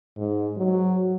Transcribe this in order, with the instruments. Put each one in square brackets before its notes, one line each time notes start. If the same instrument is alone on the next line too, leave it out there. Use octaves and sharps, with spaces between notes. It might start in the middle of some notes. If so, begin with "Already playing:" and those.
[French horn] G#2
F#3